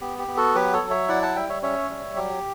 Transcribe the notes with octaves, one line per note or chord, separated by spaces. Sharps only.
B3 G4
G4
B3
F#4 A4
F#3 G4 B4
A4 C#5
F#3
C#5 E5
E4 D5 F#5
F#5 A5
G3 E5 G5
C#5 E5
C#4 C#5 E5
G3
F#3 G4